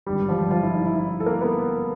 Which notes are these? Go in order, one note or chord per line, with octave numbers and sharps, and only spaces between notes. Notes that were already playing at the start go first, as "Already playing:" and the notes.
G#1 G2 D3 G3 G4
F3 F4
F3 F4
E4
D#4
E4
E4
A4
A#3 A#4
B3 B4